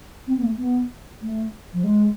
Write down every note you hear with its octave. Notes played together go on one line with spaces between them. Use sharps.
C4
B3
A3
B3
A3
F3
G#3